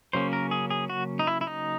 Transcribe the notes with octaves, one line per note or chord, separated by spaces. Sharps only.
C#3 F#3 A#3 C#4 C5
A#4
G#4
G#4
F#4
D#4
E4
E4
D#4